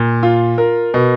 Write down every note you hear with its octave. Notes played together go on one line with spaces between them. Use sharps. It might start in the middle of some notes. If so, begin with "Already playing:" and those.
Already playing: A#2
F4
A#4
B2